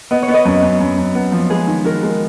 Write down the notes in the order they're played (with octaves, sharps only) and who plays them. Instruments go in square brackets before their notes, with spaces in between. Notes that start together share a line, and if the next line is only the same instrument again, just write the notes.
[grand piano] B3 [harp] D#5
[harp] C#5
[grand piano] B3
[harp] B4 D#5
[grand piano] F#2
F#2
F#2
F#2
B3
F3
[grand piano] G#3 [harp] G#4 B4
[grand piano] D#3
[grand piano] D#3 [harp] F#4 A#4
[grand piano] G#3